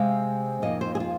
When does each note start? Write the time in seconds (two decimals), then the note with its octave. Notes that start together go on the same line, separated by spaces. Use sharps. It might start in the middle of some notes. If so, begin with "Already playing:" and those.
Already playing: C3 G#3 C4 F5
0.62 F2 F3 A#3 D#4 D#5
0.81 C5
0.95 G#4
1.00 F4